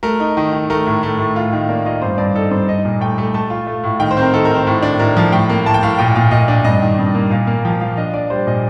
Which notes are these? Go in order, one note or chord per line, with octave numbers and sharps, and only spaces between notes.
A3 A#4
D#4
D#3
D#3
A3 A#4
A2
A3
A2
F4
D#3
A#3 D5
F4 D#5
G2 C5
G2 D5
D#4 A4
G2 C5
D#4 D#5
A#2
A3 G5
A3
A3 A5
F4
A3
A2
D#3 G5
C5
C4 A#4
D#3 A4
A#4
D#3 C5
A2
D4
A2 A#4
F3
A2 G5
A#3
A2 A5
G5
A2 F5
A#2 G5
A#2 F5
A#2 D#5
D4
G2 D#5
D#3
G2
A#3
A#2 F5
A#3
F3 G5
F3 F5
D4 D#5
D4 D5
G3 C5
A#2 D#5